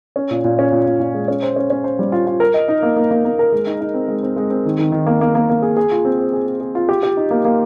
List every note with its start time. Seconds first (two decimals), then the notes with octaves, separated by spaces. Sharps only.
0.16 C#4
0.31 A#2
0.44 A#2
0.59 C#4
0.72 A#2
0.86 A#2
1.00 A#2
1.14 G#3
1.28 C#4
1.42 C5
1.56 C#4
1.70 C#4
1.84 C5
1.99 G3
2.12 F4
2.27 F4
2.40 A#4
2.54 D#5
2.68 D#4
2.82 A#3
2.96 A#3
3.11 A#3
3.25 A#3
3.39 A#4
3.52 G#3
3.67 D#4
3.81 D#4
3.94 C4
4.08 G#3
4.23 C4
4.36 G#3
4.50 C4
4.65 D#3
4.79 D#3
4.92 D#3
5.06 A#3
5.21 A#3
5.35 A#3
5.49 A#3
5.62 G#4
5.77 G#4
5.91 F4
6.05 C4
6.19 C5
6.33 G#4
6.47 G#4
6.60 G#4
6.75 F4
6.89 G4
7.03 G4
7.17 D#4
7.31 A#3
7.45 A#3